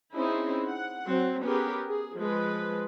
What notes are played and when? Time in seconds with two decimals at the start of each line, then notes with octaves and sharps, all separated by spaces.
0.13 C4 C#4 D#4 E4 G#4
0.67 F#5
1.07 F#3 C4
1.44 B3 C#4 G4 G#4 A#4 B4
1.86 G#4
2.16 F3 G#3 B4